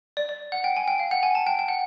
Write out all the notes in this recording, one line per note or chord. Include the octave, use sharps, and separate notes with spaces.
D5
D5
F#5
G5
G#5
G5
F5
F#5
G#5
A5
G5
G5
F#5